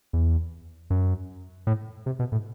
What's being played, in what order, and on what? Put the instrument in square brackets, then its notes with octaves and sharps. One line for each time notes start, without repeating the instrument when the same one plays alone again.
[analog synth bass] E2
F#2
A2
C3
B2
A2